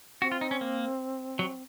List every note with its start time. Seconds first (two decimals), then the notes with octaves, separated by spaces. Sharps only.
0.22 C4 F#4
0.32 F4
0.41 D#4
0.51 C#4
0.61 A#3
1.39 F#3